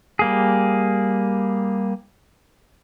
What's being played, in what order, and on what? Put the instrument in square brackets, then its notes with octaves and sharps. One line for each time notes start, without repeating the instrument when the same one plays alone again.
[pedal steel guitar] G3 A#3 G#4